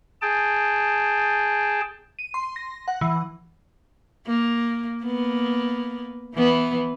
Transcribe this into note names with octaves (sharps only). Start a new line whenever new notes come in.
G#4 G5 A5
D#7
C6
A#6
F#5
E3
A#3
A#3 B3
E3 B3